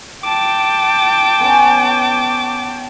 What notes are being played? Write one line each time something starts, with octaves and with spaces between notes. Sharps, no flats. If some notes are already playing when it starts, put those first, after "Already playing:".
G5 A5 D6
B3 C#4 C#5